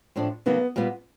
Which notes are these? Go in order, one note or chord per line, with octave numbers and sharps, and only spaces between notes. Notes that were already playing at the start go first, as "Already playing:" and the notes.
A2 F3 A3 D4
C#3 F#3 A#3 B3 D#4
A#2 G3 B3